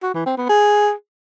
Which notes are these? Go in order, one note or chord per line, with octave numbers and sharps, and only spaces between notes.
F#4
E3
C4
B3
G#4